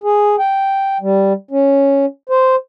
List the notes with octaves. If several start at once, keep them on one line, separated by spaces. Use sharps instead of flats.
G#4
G5
G3
C#4
C5